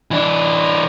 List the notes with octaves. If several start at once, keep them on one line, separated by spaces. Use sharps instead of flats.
E3 D4